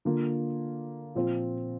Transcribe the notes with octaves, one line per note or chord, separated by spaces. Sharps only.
D3 A#3 F4
A#2 F3 C4 F4